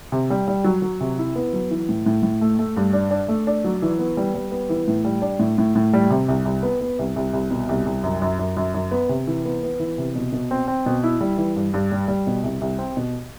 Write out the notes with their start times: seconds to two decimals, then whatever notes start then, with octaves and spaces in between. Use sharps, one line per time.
0.12 C3
0.30 G3
0.48 G3
0.64 F#3
0.82 F#3
1.00 C3
1.18 E4
1.36 B3
1.53 F#3
1.71 E3
1.89 A2
2.06 A2
2.23 A2
2.41 A3
2.59 A3
2.77 G2
2.93 D4
3.11 D4
3.28 A3
3.47 D4
3.64 F#3
3.82 E3
3.99 B3
4.17 G3
4.34 G3
4.51 B3
4.69 E3
4.87 A2
5.05 G3
5.22 D4
5.39 A2
5.58 A2
5.75 A2
5.93 G3
6.10 C3
6.28 C2
6.45 C2
6.63 B3
6.81 B3
6.99 C2
7.16 C2
7.33 C2
7.51 B2
7.69 C2
7.86 C2
8.03 F#2
8.22 F#2
8.39 F#2
8.57 F#2
8.74 F#2
8.91 B3
9.09 C3
9.27 E3
9.45 B3
9.63 B3
9.79 E3
9.98 C3
10.16 B2
10.32 B2
10.51 C4
10.68 C4
10.86 B2
11.03 E4
11.21 G3
11.38 E3
11.56 G2
11.74 G2
11.92 G3
12.08 G3
12.27 B2
12.44 C2
12.61 C2
12.78 C4
12.97 B2